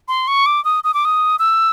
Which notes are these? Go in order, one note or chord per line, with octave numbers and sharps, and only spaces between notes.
C6
C#6
D6
D#6
D#6
D6
D#6
E6